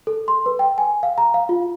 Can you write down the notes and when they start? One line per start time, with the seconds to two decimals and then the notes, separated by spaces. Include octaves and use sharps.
0.07 A4
0.28 C6
0.46 B4
0.59 G5
0.78 G#5
1.03 F5
1.18 A#5
1.34 F5
1.49 F4